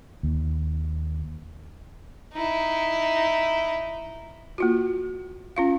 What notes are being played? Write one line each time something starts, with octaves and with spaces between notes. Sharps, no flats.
D#2
D#4 E4
A#3 F4 F#4
C#4 F4 F5